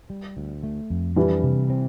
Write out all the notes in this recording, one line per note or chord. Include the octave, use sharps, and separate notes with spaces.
G3
D2
A3
F2
E3 G3 D4
C3
C4